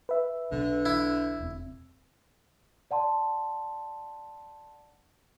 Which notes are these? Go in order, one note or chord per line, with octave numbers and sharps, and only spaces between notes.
B4 E5
B1 B2 D3 F#3
E4
E1 C4
D5 F#5 A5 C6